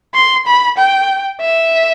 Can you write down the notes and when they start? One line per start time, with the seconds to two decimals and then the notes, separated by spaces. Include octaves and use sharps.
0.15 C6
0.47 B5
0.78 G5
1.41 E5